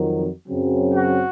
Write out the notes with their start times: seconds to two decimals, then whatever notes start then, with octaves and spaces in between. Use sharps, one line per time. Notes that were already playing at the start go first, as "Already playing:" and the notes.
Already playing: F2 D#3 F#3
0.46 F#2 C#3 F#3 C4
0.95 F#4